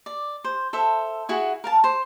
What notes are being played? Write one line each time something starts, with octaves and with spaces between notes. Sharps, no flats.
D5
C5
A4 C5 E5
E4 F#4 G#4 F#5
A#4 F5 A5
C5